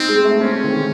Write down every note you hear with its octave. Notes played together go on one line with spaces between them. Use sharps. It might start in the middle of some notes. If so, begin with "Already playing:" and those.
Already playing: C4 D#4
G#3
A3
C4 C#4
D#3
D#3